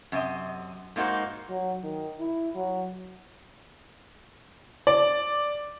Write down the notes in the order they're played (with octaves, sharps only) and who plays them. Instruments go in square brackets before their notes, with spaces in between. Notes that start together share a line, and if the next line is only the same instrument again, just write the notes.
[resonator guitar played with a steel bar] F#2 C3 F4 D#5
G#2 A#3 D#4 F#4 C5
[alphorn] F#3
D#3
E4
F#3
[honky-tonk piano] D5